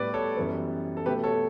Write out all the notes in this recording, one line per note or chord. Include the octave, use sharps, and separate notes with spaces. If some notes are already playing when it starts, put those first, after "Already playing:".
Already playing: A2 G3 B3 B4 D5
A4 C#5
F#2 E3 G3 B3
A4
B2 A3 G4 B4
A4 C#5